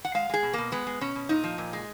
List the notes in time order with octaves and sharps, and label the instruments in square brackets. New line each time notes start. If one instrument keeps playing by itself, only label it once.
[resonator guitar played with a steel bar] F#5
G#3 F5
G#3 G#4
B2
B2 A#3
G#3 B3
G#3
B2 C#4
B2
A#2 D#4
F3
A#2
G#3